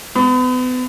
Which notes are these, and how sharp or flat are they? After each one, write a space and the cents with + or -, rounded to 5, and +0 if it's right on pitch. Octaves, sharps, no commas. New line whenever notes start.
B3 +35